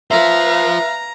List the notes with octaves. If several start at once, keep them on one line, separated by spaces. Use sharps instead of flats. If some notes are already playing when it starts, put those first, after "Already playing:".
F4 B4 C5 E5 F5 A#5